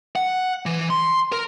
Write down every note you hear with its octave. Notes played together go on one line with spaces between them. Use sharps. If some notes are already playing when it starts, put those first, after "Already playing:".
F#5
E3
C6
A#4